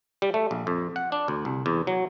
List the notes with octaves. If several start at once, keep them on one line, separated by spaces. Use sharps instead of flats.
G3
A3
A#1
F2
F#5
D4
D2
C2
E2
F#3